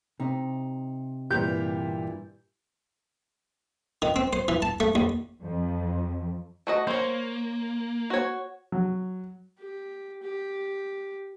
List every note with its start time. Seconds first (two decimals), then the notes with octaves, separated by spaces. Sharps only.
0.20 C3 D#4
1.31 G2 A#2 E3 G4 G6
4.02 D#3
4.16 C4
4.33 C5
4.48 E3
4.62 A5
4.80 A3
4.95 D#2
5.41 F2
6.67 A3 F#4 D#5
6.87 A#3 C5 C#5
8.10 F#4 C#5
8.72 F#3
9.59 G4
10.22 G4